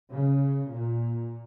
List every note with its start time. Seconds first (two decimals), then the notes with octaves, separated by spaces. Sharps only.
0.11 C#3
0.71 A#2